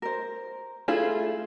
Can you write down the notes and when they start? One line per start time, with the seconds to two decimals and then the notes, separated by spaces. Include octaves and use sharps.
0.02 A#4 C5
0.88 A3 E4 F4 G#4